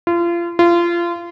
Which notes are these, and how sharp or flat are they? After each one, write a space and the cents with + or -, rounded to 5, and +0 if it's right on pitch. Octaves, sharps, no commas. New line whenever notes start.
F4 -30
F4 -25